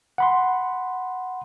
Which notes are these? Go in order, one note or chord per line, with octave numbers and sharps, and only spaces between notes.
F#5 B5 C6